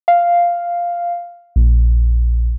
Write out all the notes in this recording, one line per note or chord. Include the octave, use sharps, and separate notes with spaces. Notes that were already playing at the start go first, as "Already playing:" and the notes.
F5
A#1